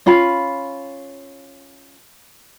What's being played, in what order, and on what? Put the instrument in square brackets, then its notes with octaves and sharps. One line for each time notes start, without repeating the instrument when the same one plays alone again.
[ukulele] C#4 F4 F5 B5